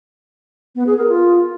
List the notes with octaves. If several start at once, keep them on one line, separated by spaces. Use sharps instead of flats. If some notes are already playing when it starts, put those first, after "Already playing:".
B3
G#4
A#4
F4